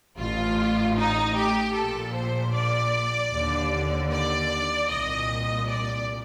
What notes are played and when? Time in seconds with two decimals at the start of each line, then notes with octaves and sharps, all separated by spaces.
0.18 A1 A2 F4
0.96 D#4
1.36 G4
1.75 A#1 A#2 A4
2.14 C5
2.53 D5
3.31 D#2 D3
4.11 D5
4.89 C2 A#2 D#5
5.68 D5